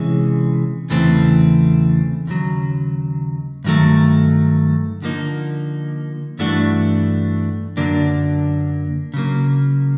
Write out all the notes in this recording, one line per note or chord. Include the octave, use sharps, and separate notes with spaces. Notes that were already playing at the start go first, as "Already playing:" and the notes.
Already playing: C3 E3 G#3 C#4
E2 C#3 E3 A3 C4
D#2 C#3 F#3
G2 D#3 F#3 A3
D3 F3 A#3 D#4
G2 E3 A3 D4 F#4
F#2 D3 F#3 A#3 D4
C#3 F#3 A#3